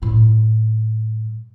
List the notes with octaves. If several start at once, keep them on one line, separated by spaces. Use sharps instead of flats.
A2 G3